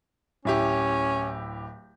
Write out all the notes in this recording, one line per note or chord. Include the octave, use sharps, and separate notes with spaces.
D1 C#4 E4 G4